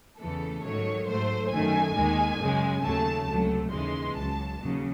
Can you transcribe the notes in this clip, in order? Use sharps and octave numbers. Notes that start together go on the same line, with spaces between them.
E2 C#3 E3 A3 A4
G#2 D#3 F#3 A3 C#5
G#2 F#3 A3 C5
F#2 D#3 A3 G#5
D#2 D#3 G#3
F#2 C#3 G#3
D#2 C#3 F#3 A3 A5
C#2 C3 F#3 A3
D#2 C#3 E3 G#3 C6
C#2 C#3 F#3 A5
D#2 C#3 F#3